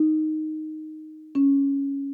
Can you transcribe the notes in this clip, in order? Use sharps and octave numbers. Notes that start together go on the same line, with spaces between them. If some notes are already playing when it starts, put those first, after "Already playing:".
Already playing: D#4
C#4